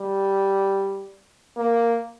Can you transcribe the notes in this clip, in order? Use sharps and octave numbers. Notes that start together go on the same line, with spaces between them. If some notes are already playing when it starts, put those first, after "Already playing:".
Already playing: G3
A#3